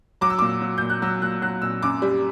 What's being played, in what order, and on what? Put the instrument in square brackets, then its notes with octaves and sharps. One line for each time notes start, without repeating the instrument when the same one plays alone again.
[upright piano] F#3 D6
E6
A#2 D6
F#3
A#2 G6
F#6
F#3 E6
A#2 F#6
F#3 F#6
A#2 E6
F#2 D6
G3